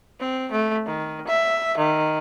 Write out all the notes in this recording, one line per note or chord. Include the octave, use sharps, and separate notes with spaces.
C4
A3
D#3
E5
D#3